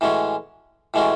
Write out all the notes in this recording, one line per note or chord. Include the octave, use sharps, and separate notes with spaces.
A2 E3 G#3 C#4 F#4
A2 E3 G#3 C#4 F#4